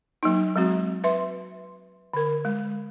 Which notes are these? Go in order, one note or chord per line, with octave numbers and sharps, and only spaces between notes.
F#3 A#3 D#4
F#3 G#3 C4 F#4
B4 E5 C6
D3 A#4
G#3